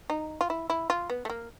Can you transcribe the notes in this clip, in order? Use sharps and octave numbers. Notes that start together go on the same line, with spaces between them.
D#4
F4
E4
E4
F4
B3
A3
A#3